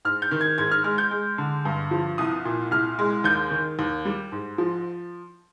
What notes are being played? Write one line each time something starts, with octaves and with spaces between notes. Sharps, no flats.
G#2 F6
G6
D#3
G#6
G#2 G#6
F6
G#3 F6
G6
G#3
D3
G2
F3
C2 D#6
A#2
C2 F6
G#3
D#2 G6
D#3
D#2
G3
G#2
F3